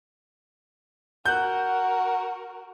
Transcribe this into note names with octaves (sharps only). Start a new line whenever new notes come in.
F#4 A#4 F#6 G6